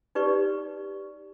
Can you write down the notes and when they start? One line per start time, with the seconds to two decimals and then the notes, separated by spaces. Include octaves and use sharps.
0.15 D#4 G4 B4 D5 C#6